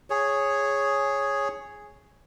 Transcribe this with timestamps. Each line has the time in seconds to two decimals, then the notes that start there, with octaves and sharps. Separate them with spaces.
0.10 G#4 C#5